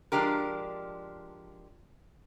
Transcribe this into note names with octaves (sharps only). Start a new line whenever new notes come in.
F3 G#3 D4 G4 A#4